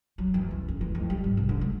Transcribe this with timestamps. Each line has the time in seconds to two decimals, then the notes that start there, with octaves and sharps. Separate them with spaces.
0.18 F#3
0.34 E2
0.51 C#2
0.68 D2
0.81 E3
0.95 F2
1.10 G3
1.24 G#1
1.37 C3
1.49 D3
1.61 G#3